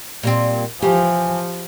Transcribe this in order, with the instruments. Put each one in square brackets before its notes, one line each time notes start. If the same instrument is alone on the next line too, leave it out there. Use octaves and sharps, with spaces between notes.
[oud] A#2 G3 C4
[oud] E3 [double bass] F3 [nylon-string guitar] G4 [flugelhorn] G#5